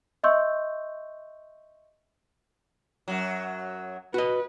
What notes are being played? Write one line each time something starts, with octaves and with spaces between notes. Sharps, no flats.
D#5 E5 C6 C#6 E6 G6
F#2 F#3
F#4 B4 D#5